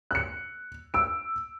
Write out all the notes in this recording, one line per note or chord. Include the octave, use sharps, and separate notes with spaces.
F#6 C#7
E6 D7